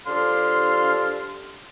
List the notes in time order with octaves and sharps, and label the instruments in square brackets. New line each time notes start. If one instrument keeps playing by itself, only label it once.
[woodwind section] F3 D4 G4 A4 F5 C6